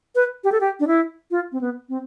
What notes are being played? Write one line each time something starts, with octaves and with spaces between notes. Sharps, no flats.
B4
G4
A4
G4
D4
E4
F4
C4
B3
C4